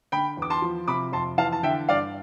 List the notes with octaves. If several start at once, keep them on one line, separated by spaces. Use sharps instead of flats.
D3 G5 B5
E2 D6
A5 C6
F3
C3 B5 D6
F2 A5 C6
E3 F5 A5
A5
D3 E5 G5
G2 D5 F5